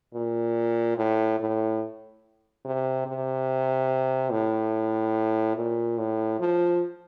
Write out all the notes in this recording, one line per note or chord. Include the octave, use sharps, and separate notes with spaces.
A#2
A2
A2
C3
C3
A2
A#2
A2
F3